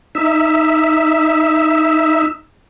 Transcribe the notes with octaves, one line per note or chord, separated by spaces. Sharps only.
D#4 E5